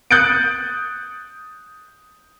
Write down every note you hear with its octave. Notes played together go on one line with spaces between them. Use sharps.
D#6 F#6 G6 A6 C#7 D7